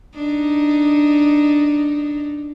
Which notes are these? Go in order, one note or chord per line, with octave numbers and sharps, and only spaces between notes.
D4 D#4